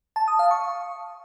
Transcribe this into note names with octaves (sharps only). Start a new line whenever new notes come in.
A5
D#6
F5
C#6